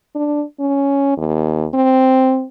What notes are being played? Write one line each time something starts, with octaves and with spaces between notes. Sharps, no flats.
D4
C#4
D#2
C4